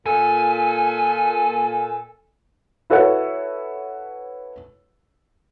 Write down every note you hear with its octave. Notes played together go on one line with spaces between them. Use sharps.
A#2 A4 G#5
E4 F#4 A4 B4 C#5 F#5